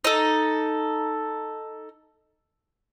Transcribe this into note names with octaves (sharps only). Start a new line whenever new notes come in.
D#4 A4